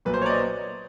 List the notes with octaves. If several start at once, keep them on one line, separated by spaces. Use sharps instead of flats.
B1 A#2 F#3 B4
C5
C#5
D5
D#5